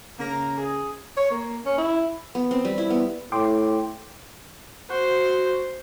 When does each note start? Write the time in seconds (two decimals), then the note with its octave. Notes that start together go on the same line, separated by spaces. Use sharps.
0.20 C#3 A#3 A#5
0.58 G#4
1.17 C#5
1.31 A#3
1.66 C#4
1.78 E4
2.35 B3
2.51 C4
2.65 G3
2.78 E4
2.90 B3
3.32 A2 G5 C6 D6
4.90 F#4 C5